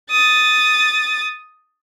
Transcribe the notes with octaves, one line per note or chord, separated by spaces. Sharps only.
D#6 A6